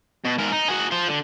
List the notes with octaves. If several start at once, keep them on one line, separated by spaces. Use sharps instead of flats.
B2
G#2 A#4
D#4
F#4 G#4
F4 C5
D3